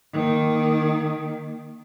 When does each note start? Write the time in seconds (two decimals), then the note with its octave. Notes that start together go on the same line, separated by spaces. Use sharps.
0.13 D#3 A#3